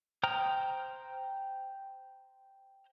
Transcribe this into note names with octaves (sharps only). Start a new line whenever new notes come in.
C5 G5 A#5 D#6 F6